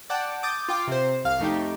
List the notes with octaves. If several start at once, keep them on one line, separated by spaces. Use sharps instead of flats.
D5 F#5 G5 A5
D6 D#6 G6 A6
F4 G5 D6
C3 C5
C2 F5 F6
F2 A3 D#4 G4